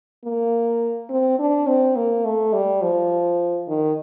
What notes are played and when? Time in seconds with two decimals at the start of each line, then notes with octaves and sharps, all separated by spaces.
0.24 A#3
1.10 C4
1.39 D4
1.67 C4
1.96 A#3
2.24 A3
2.53 G3
2.82 F3
3.68 D#3